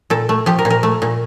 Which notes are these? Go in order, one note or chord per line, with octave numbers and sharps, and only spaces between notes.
A#2 A4
A3
F3 G4
A#4
A#2
A#4
A3
A#2